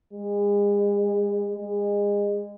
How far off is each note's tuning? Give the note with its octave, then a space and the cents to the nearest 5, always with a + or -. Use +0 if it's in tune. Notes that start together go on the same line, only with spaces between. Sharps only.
G#3 -35
G#3 -30